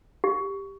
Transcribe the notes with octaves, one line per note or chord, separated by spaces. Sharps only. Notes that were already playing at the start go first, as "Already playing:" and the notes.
G4